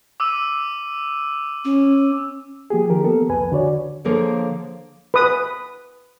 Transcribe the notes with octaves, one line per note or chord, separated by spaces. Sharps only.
D6 E6 D#7
C#4
F3 A#3 G4 G#4
D#3 F3 G4 A#4
A#3 B3 A4 A#4
C2 F2 B4 G#5
D3 F#4 C#5 D5
D3 F3 A#3 G#4 A4 C#5
B4 D#6